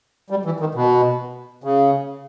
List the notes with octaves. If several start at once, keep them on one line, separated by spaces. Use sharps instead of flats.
G3
E3
D#3
B2
C#3